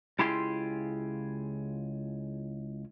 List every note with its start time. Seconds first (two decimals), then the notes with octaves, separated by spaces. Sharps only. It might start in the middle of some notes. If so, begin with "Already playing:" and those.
0.19 C#2 E4 F4 G4 G#4 C6